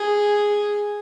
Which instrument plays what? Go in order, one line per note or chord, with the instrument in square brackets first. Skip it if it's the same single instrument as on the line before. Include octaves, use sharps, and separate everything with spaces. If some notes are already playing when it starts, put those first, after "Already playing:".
Already playing: [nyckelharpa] G#4